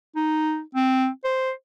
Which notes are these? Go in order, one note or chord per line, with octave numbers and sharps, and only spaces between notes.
D#4
C4
C5